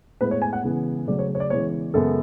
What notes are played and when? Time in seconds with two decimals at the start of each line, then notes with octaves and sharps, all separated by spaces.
0.21 A2 G#3 B3 B4
0.31 C#5
0.42 G#5
0.53 F#5
0.64 C#3 E3 G#3 B3
1.07 C#3 F#3 A3 D5
1.19 C#5
1.35 C#5
1.40 D5
1.50 C#3 E3 G#3 B3 C#5
1.94 F#2 C#3 G#3 B3 A4